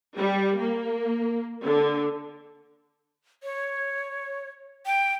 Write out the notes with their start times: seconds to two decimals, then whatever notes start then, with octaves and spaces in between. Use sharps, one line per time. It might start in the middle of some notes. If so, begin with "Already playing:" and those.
0.17 G3
0.60 A#3
1.66 D3
3.43 C#5
4.86 G5